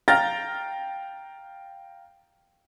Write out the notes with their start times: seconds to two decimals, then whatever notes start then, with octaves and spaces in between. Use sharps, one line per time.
0.08 F5 G5 A#5 F6 A6 A#6